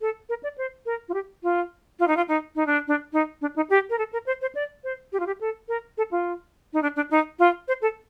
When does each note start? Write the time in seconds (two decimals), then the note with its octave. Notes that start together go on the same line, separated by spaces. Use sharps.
0.01 A4
0.29 A#4
0.43 D5
0.58 C5
0.86 A#4
1.08 F4
1.14 G4
1.43 F4
1.99 F4
2.07 D#4
2.17 F4
2.28 D#4
2.56 D#4
2.66 D4
2.87 D4
3.13 D#4
3.41 D4
3.56 D#4
3.70 G4
3.90 A#4
3.98 A4
4.13 A#4
4.26 C5
4.41 C5
4.55 D5
4.84 C5
5.12 G4
5.20 F4
5.26 G4
5.41 A4
5.68 A#4
5.97 A4
6.11 F4
6.73 D#4
6.82 D4
6.96 D4
7.11 D#4
7.39 F4
7.68 C5
7.82 A4